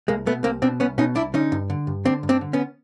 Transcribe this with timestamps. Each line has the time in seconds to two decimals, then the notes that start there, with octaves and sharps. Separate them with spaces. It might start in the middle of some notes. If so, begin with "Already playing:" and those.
0.08 C2 G#3 A#3
0.26 B2 A3 B3
0.44 C2 A#3 C4
0.62 B2 C4 D4
0.80 C2 B3 C#4
0.98 B2 C#4 D#4
1.16 C2 D4 E4
1.34 D3 C#4 D#4
1.52 G2
1.70 D3
1.87 G2
2.05 D3 C4 D4
2.23 G2
2.29 C4 D4
2.41 D3
2.53 B3 C#4